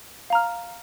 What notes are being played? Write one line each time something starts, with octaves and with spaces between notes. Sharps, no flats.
F5 A#5 F6